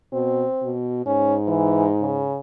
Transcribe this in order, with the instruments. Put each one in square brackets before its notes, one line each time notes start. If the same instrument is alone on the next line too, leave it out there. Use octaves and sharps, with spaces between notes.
[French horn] B2 [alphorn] C4
[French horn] B2
[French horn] G#2 [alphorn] C#4
[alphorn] E3
C#3